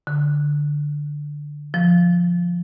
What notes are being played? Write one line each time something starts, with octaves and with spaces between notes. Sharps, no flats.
D3
F3